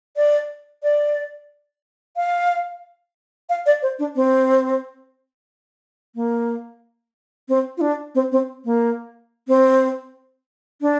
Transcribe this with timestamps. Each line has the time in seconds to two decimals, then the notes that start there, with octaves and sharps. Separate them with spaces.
0.16 D5
0.83 D5
2.16 F5
3.49 F5
3.66 D5
3.82 C5
3.99 D4
4.16 C4
6.15 A#3
7.49 C4
7.78 F4
7.81 D4
8.15 C4
8.32 C4
8.65 A#3
9.48 C4
10.81 D4